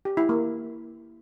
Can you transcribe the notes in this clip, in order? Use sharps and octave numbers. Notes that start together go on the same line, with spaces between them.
G4
E4
A#3